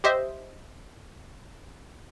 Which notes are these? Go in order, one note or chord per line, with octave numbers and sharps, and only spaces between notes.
G4 C5 D#5 E5